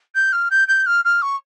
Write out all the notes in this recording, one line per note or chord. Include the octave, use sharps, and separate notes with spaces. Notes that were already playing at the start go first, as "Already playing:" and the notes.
G6
F6
G6
G6
F6
F6
C#6